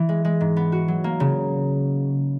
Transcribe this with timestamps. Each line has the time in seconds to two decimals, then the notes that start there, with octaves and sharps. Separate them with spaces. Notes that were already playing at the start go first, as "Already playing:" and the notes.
Already playing: E3
0.09 G#3
0.25 G#3
0.41 G#2
0.57 B3
0.72 F#4
0.88 F#3
1.04 A#3
1.20 C#3